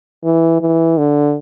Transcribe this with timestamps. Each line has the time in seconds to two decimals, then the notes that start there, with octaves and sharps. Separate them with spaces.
0.24 E3
0.61 E3
0.97 D3